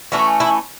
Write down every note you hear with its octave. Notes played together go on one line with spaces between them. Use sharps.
E3 A3 C#4 F#4
E4